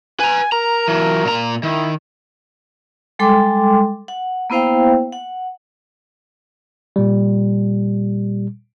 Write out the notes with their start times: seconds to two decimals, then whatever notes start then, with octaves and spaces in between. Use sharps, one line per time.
0.20 B4 G#5 A#5
0.52 A#4 A#5
0.88 E3 F#3
1.25 A#2 A#5
1.63 D#3 E4
3.19 G3 G#3 A4 G5 C6 D6
4.08 F#5
4.50 A#3 B3 E4 C5 F5 G5
5.12 F#5
6.96 A#2 G3